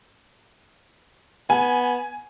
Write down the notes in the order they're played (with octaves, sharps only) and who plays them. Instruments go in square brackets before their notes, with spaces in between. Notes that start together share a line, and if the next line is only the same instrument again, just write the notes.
[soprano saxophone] B3 [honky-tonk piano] G#5